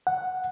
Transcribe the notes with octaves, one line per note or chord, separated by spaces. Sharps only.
F#5